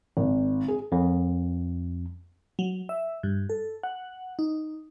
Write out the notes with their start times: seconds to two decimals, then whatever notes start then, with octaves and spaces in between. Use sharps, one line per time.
0.17 G#1
0.68 G#4
0.92 F2
2.59 F#3
2.89 E5
3.23 G2
3.50 A4
3.83 F#5
4.39 D#4